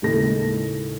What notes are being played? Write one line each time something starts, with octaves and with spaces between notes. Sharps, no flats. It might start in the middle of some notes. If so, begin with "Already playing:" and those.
D#2 A2 C#3 G#3 A4 A#6